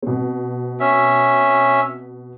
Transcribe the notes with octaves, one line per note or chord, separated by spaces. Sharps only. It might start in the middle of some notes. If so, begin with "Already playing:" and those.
B2 C4
C#4 E5